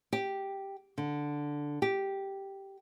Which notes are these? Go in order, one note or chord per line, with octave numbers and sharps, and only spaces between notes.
G4
D3
G4